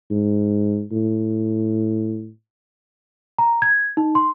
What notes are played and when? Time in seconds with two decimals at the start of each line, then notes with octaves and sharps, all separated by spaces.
0.11 G#2
0.92 A2
3.38 A#5
3.62 G#6
3.97 D#4
4.15 C6